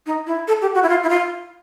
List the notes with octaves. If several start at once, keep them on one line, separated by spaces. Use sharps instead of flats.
D#4
E4
A4
G4
F#4
E4
F4
E4
F4